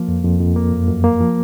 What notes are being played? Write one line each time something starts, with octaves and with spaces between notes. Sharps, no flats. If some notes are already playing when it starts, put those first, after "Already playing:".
Already playing: F3 A#3
F2
F2
F2
A#3
F#2
F#2
A#3
F3